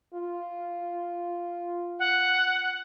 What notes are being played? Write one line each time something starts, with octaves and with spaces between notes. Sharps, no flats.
F4
F#5